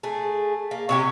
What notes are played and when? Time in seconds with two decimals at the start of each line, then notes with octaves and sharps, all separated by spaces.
0.03 A3 G#4
0.71 A#3
0.89 C3 C#4 G4 C#6